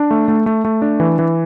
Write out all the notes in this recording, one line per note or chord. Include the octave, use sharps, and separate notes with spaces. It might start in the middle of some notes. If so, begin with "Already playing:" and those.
Already playing: D4
A3
A3
A3
A3
D4
E3
E3